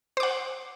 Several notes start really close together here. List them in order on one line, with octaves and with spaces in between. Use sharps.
C5 D6 F#5